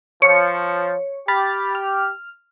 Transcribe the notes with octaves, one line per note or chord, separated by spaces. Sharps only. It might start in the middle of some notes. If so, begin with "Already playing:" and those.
F3 C#5 C#7
G4 B5 F6 A6
F6